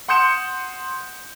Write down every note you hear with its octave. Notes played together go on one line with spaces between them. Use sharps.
F#5 C6 D#6 G6 C#7 E7